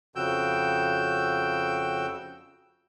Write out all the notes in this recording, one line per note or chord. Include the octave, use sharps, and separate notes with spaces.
F2 C#3 F#4 G5 E6 G6